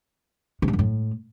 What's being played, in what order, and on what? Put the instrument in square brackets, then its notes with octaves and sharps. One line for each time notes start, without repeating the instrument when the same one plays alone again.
[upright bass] C3
G2
F#2
A2